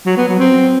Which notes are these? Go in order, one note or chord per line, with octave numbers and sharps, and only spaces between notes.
F#3
B3
F#3
C4